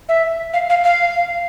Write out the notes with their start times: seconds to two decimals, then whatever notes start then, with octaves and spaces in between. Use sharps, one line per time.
0.09 E5
0.53 F5
0.70 F5
0.84 F5